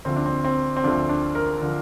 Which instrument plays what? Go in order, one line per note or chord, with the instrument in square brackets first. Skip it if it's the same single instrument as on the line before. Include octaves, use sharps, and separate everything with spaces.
[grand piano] D2 D3 F3 C4
D4
C4
C4
C4
D2 D3 F3 D4
D4
A#4
D3 F3